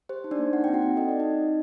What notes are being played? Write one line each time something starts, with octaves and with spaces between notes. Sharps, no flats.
G4 C5
D#4
D4 D5
A#3
D#4 F#5
C4 G5
F#4 F#5
C4
A4 D#5
D#4 D5
D#4 D#5
C4
C4